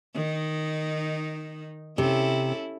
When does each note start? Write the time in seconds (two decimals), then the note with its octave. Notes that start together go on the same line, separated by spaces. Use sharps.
0.15 D#3 D#4
1.98 C3 C#4 E4 A4